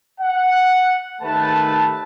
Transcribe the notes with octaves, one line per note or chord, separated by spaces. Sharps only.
F#5
D#2 A3 B4 A5